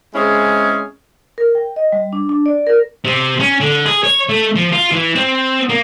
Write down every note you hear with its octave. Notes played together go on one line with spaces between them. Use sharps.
G#3 C4 C#4 E4 G#4
A#4
G5
D#5
G3
D4
D4
D5
A#4
C3
C#4
D3
G#4
C#5
A3
F3
F4
E3
C4
A#3